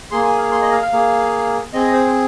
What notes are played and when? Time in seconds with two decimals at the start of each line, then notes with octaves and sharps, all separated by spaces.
0.11 A#3 G#4 C6
0.25 G#5
0.38 F5
0.52 C6
0.62 D#5
0.72 F5
0.82 F5
0.92 A#3 G#4
1.73 C4 G#4 D#5
1.93 C5